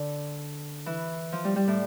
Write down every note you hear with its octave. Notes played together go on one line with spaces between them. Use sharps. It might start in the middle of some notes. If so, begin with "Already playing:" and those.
Already playing: D3
E3
F3
G3
G3
A2